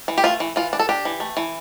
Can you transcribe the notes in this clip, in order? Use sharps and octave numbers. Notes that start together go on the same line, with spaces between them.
E3
G4
A3 F4
E3
E3 F4
D4
A4
D4 G4
E3
A3
E3